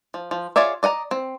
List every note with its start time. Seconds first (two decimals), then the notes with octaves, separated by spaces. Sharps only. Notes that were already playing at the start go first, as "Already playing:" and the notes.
0.14 F3
0.31 F3
0.56 F4 G#4 C#5 D5 E5
0.83 D5 D#5 F#5 A#5
1.11 C4